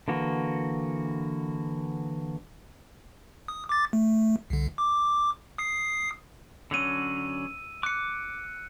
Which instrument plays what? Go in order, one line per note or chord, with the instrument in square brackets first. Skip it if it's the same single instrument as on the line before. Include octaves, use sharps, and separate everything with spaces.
[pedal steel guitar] D3 E3 A#3 F#4
[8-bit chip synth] D#6
D6 A6
A3
C2 D3
D6
D#6 C7
[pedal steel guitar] D3 F#3 C#4 [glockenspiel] E6 D#7
[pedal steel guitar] D6 [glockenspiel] F#6 C#7